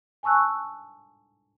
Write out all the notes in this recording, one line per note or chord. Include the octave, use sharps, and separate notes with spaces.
G#5 A5 C#6 E6 F#6